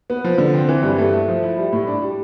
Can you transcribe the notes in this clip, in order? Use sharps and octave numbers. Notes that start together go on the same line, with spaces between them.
B3
F3
D3
C4
E3
G2
A3
A3
F3
E4
G3
A2
D4
G3